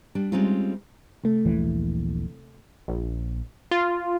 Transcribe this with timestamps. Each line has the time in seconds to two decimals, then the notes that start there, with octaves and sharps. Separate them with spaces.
0.15 G3 D4
0.32 G3 G#3 C4 C#4 D#4 F4
1.24 C3 A3
1.45 D#1 A#1 E3
2.88 A#1
3.71 F4